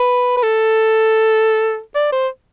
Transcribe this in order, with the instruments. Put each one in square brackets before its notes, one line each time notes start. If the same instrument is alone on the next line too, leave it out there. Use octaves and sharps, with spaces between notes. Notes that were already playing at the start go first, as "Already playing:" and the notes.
Already playing: [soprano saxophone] B4
B4
A4
D5
C5